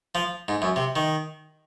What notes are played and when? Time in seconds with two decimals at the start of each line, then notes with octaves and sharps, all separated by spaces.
0.15 F3
0.48 G#2
0.62 F#2
0.76 C3
0.96 D#3